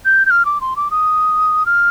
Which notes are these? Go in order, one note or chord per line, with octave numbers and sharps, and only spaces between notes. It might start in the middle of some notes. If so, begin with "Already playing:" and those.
G6
G6
F6
D6
C6
D6
D#6
F6